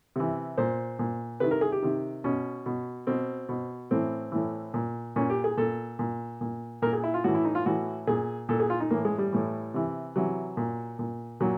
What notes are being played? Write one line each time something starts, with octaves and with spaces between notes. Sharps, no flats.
C3 E3
A#2 C5
A#2
C3 D#3 B4
A#4
G#4
G4
C3 D#3
B2 C#4
B2
B2 C4
B2
A2 E3 C4
A2 E3
A#2
A#2 C#4
G4
G#4
A#2 A4
A#2
A#2
A#2 A#4
G#4
E4
F4
A2 E3 F#4
E4
D#4
F4
A2 E3 F#4
A#2 G#4
A#2 A4
G#4
F4
D#4
A2 E3 A#3
G#3
G3
A2 E3
C3 E3
C3 E3 F#3
A#2
A#2
A#2 F#3